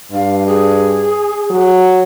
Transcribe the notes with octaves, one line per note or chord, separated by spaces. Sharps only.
G2 F5
G#4
F#3